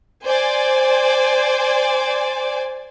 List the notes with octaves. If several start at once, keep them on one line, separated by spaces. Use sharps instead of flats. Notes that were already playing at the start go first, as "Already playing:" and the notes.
C5 D5 G#5